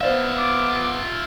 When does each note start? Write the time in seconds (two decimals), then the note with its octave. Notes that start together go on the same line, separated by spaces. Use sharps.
0.01 B3 F4 C5 D5 E5 F5
0.37 D6